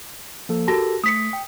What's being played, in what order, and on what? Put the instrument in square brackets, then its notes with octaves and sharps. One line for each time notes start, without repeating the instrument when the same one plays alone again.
[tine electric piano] F3 A#3 A4
[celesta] F#4 A5 A#6 [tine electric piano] G4 A4 A#4
[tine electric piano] A3 [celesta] D#6 B6 C#7
[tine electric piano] G5